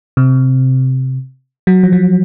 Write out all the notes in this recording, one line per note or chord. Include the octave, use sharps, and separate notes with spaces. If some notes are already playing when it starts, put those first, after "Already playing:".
C3
F#3
F3
F#3